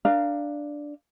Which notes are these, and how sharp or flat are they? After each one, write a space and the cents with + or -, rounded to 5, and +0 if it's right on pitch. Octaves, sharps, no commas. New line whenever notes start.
D4 +0 A#4 +0 F5 -10